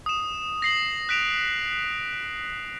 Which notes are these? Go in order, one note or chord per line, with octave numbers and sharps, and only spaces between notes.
D#6 E7
A#6 C7 F#7
F#6 B6 D7 E7 F7